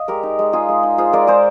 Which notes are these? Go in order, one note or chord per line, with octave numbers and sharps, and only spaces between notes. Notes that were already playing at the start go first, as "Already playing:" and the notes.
Already playing: D#5 F5
G#3 G4 A#4
D#4
G#3
D#4 F4 G#4
G#3
D#4
F4 G#4 C5
G#3 A#4 D5
G#3 G#4 C5